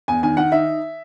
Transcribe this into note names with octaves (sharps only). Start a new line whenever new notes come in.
E2 G#5
D#3 G#5
D#3 F#5
D#4 E5